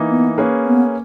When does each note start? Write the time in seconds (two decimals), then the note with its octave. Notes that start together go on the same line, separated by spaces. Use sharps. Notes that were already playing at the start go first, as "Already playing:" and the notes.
Already playing: E3 A#3 D#4
0.10 B3
0.38 A#3 C#4 G#4 B4
0.66 B3